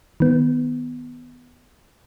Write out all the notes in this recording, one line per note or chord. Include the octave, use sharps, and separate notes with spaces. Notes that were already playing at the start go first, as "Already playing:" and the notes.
D#3 B3